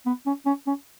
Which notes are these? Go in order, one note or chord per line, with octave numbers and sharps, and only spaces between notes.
B3
C#4
C#4
C#4